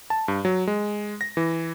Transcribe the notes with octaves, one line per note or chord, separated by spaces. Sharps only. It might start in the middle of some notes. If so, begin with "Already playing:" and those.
A5
G2
F#3
G#3
A#6
E3